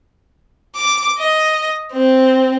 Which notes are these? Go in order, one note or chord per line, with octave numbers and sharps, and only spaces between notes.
D6
D#5
C4